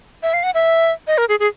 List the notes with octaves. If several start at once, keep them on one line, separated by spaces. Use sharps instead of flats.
E5
F5
F#5
E5
D#5
A#4
G#4
G#4